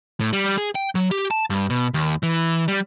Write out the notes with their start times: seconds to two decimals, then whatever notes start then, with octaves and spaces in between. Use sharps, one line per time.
0.20 A2
0.33 G3
0.58 G#4
0.75 G5
0.95 F#3
1.11 G4
1.31 A5
1.50 G2
1.70 B2
1.94 D#2
2.23 E3
2.68 G3